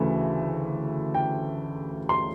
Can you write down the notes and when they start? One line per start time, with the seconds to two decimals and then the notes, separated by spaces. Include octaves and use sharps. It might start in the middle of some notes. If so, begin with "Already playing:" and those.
Already playing: D2 C#3 E3 A3
1.15 G5
2.09 C6